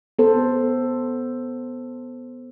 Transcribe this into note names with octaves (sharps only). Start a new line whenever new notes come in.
B3 A4 C5